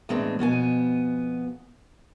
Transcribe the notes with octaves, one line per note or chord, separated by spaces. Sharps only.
E2 A2 G#3 C4 D4
F2 B2 B3 G#5